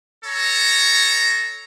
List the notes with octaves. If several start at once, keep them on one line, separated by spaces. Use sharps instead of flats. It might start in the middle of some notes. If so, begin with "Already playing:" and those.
A4 C#5 A#5